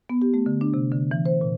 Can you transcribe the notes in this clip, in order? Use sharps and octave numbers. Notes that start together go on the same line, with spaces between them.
B3
G4
A3
D3
D4
C3
D3
E3
C5
A#2